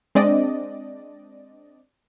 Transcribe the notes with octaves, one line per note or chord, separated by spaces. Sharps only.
G#3 C4 D4 D5 D#5